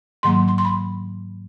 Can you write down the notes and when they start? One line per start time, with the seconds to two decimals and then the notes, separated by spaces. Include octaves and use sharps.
0.23 G#2 D#3 F#3 A#3 C6
0.48 C6
0.58 C6
0.65 B5